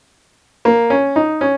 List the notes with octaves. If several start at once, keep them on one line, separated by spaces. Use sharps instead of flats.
A#3
C#4
D#4
C#4